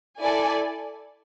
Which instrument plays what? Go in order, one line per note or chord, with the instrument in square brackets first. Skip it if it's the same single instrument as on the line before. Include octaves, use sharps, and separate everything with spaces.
[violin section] E4 A4 D5 G#5